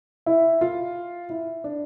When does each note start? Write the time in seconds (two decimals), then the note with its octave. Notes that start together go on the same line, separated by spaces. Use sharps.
0.26 E4
0.61 F4
1.30 E4
1.64 D4